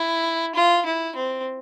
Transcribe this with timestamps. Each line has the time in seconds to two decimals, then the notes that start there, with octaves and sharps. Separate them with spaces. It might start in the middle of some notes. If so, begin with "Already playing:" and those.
Already playing: E4
0.55 F4
0.86 E4
1.16 C4